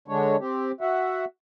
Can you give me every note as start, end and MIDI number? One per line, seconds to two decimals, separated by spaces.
0.08 0.36 50
0.08 0.36 56
0.08 0.36 62
0.08 0.36 73
0.40 0.72 60
0.40 0.72 67
0.81 1.25 66
0.81 1.25 76
0.81 1.25 78